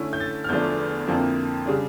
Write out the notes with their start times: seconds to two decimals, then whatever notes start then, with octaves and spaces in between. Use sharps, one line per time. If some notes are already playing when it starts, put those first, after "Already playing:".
Already playing: D3 A3 C#4 E4
0.13 G6
0.20 A6
0.44 F6
0.49 E2 D3 F3 A3 D4 G6
1.07 F2 D3 F3 A#3 E4
1.66 C#3 G3 D4